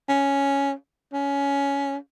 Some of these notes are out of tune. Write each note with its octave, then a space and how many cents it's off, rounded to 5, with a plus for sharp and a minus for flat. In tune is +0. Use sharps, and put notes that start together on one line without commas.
C#4 +5
C#4 +15